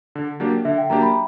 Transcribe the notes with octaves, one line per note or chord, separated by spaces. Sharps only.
D3
F#3 A#3 D4 G4
D3 E5
G5
F#3 A#3 D4 G4 A#5
B5